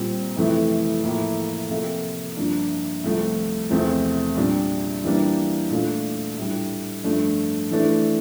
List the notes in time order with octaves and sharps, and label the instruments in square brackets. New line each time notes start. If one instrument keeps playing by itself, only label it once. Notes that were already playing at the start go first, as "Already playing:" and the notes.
Already playing: [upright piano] A#2 G3 C4
F2 C3 E3 A3
A2 F3 A#3 E4
C3 F3 A#3 F4 A4
G2 F3 A#3 D4
C2 C3 F3 A3
E2 C3 F3 A3 C4
A#2 G3 D4
E3 G3 A#3 D4
A#2 A3 D4 F4
A2 G3 D4
G2 F3 A3 D4
E3 A3 D4